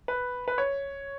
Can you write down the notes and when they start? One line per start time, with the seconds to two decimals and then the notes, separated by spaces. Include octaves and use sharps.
0.08 B4
0.48 B4
0.58 C#5